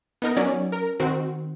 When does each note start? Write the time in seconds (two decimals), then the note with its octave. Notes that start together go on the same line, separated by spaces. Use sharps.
0.22 B3 D#4 A#4
0.37 F#3 C#4 D5
0.72 A#4
1.00 D#3 C4 F#4